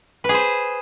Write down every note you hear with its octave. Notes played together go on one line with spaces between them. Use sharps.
G#4 B4 C5